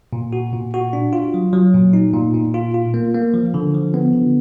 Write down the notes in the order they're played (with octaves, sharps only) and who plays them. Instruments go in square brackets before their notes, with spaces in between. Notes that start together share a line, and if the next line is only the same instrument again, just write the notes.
[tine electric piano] A#2
F#4
A#2
F#4
D4
F4
F#3
F#3
A#2
D#4
A#2
A#2
F4
F4
A#3
A#3
F3
D3
F3
B3
D3